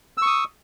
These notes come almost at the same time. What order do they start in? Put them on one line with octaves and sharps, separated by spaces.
E6 C#6 D#6